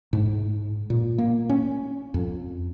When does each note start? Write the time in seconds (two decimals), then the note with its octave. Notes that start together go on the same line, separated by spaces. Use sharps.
0.13 G#2
0.90 A#2
1.18 A#3
1.50 C#4
2.14 F2